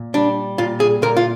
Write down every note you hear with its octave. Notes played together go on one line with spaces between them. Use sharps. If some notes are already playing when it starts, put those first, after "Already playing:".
Already playing: A#2
G3 D4
A#2 F4
G#4
A#2 A#4
F4